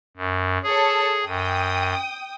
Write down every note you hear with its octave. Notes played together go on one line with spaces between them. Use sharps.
F#2
G#4 A4 C#5
F#2 G5 D#6